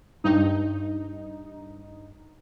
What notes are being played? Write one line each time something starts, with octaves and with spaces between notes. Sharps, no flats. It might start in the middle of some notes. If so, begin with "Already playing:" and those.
G2 D#4